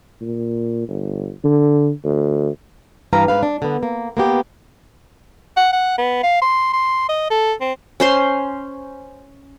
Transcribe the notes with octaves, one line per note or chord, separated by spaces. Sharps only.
A#2
G1
D3
D2
G2 E3 B4 F5 A#5
G#2 B4 F5
D4
D3 B3
A#3
A#3 B3 G4
F#5
F#5
B3
F5
C6
C6
D#5
A4
C4
C#4 C5 C6